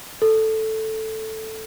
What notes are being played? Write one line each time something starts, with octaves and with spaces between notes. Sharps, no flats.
A4